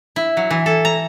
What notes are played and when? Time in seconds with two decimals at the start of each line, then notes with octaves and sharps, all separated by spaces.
0.16 E4
0.37 F#3
0.50 E3
0.66 A4
0.85 A#5